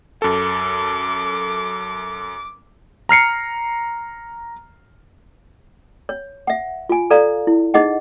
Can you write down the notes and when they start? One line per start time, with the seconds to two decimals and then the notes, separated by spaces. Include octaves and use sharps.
0.22 F#2 A4 D6
3.09 A#5 F6 C7 C#7
6.09 C#5
6.47 E5 F#5
6.89 F4 G#5
7.10 A4 D5 F5 A#5
7.47 E4
7.74 D#4 G#4 D#5 F#5